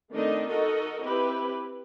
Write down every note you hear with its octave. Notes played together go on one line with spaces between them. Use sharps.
D#3 A3 C4 D4 D#4 D#5
D#4 F#4 A4 A#4 D#5
C4 E4 G4 B4